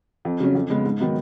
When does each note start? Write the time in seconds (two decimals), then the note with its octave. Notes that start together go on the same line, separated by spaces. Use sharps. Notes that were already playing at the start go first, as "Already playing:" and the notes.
0.25 F2
0.40 C#3 F#3 C#4
0.55 F2
0.70 C#3 G#3 B3
0.85 G#2
1.00 D#3 F#3 B3 D#4